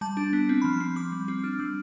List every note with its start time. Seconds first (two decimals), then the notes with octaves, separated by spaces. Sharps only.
0.01 G3 A5
0.17 D4
0.33 B3
0.49 C4
0.62 F3 B5
0.73 C6
0.80 C4
0.96 C4 D6
1.12 G3
1.28 C4
1.43 D4 F6
1.59 G3 E6